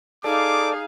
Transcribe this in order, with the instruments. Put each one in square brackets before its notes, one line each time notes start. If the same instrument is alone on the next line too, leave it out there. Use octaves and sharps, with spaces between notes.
[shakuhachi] D#4 [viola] G#4 F5 [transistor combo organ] A4 D5 [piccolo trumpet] D6